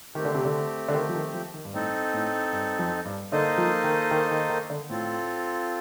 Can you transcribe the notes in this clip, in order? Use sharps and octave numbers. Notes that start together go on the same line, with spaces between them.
D#3 A3 C4 G4
D3
C3
D3
D3
D#3
F3
D#3
F3
D#3
G2
A2 C4 D#4 A4
A2
G2
F2
G2
D3 A#3 D#4 A4 C5 D#5
F3
D#3
D#3
D#3
D#3
D3
A2 C4 F4 A4